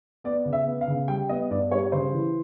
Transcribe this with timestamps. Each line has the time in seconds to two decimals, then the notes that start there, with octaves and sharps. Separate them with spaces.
0.24 B3 D5
0.45 C#3
0.53 E5
0.66 B3
0.81 F5
0.88 C#3
1.08 G3 G5
1.29 B3 D#5
1.50 G2 D5
1.71 G3 C#5
1.92 C#3 C5
2.13 E3